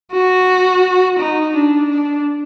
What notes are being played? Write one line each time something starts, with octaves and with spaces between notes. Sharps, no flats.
F#4
D#4
D4
D4